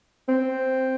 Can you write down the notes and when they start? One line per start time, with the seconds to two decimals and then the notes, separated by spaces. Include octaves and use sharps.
0.28 C4